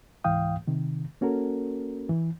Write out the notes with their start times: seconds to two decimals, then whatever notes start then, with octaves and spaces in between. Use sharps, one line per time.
0.24 C#2 G#2 E3 F5 G5 D#6
0.67 C3 D#3
1.21 A#3 C#4 F#4 A4 A#4
2.09 E3